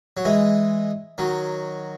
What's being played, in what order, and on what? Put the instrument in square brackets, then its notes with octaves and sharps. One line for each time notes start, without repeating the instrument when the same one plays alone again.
[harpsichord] F#3
E3 G#3
D#3 F#3